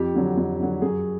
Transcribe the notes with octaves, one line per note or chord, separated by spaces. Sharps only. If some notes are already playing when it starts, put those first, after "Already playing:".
Already playing: F2 G4
D3 F#3
F2
D3 F#3
F#2 G#4